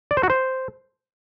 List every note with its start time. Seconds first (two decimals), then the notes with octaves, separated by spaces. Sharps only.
0.11 D5
0.17 C5
0.23 F#4
0.30 C5